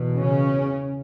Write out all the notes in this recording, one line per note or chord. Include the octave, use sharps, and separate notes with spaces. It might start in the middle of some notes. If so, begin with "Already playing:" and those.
Already playing: E2 B2
C#3 C#4